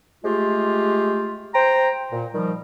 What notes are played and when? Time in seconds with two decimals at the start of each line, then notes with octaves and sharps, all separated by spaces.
0.25 G#3 A3 F4 G4
1.54 C5 G5 A#5
2.12 A#2
2.34 D#3 F3 G3